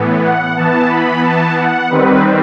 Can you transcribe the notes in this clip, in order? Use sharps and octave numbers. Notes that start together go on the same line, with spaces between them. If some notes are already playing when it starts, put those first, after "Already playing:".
Already playing: A2 E3 B3
F#5
E3 B3 A5
B5
A5
F#5
D#3 G3 C4 B4